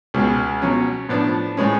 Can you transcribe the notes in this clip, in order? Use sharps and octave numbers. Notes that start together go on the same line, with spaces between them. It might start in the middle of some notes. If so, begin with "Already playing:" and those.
C#2 B2 G#3
B2 F#3 C#4
A2 F3 B3 D4
A2 G#3 C#4